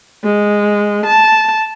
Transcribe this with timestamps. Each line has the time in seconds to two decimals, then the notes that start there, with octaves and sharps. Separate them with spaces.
0.24 G#3
1.06 A5